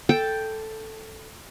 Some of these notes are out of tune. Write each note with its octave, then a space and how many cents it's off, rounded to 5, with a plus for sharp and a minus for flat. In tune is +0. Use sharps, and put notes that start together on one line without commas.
A4 +0 G5 +0